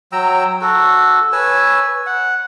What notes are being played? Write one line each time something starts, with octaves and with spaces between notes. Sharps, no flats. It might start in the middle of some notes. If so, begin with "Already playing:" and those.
F#3 G5 A#5 E6
F#4 A4
B4 C#5 G#5 E6
F#5